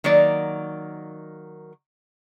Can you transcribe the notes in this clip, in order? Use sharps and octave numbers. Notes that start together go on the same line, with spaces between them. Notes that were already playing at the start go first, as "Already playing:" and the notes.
D#3 F#3 A#3 D5